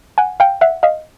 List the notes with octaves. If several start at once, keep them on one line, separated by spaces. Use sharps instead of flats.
F#5 G#5
F5 G5
E5 F#5
D#5 F5